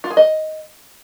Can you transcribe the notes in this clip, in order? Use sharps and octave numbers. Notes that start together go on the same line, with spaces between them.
F4
G#4
D#5